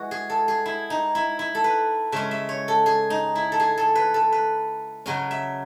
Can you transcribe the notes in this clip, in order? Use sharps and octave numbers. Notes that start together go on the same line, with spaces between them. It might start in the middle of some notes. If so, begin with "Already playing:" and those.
Already playing: E3 G#3 F#4
G#4
A4
G#4
E4
D#4
E4
E4
A4
B4
C#3 G#3 C#4 E5
E5
C#5
A4
G#4
D#4
E4
A4
G#4
A4
B4
A4
B4
C#3 F#3 C#4 D#5
E5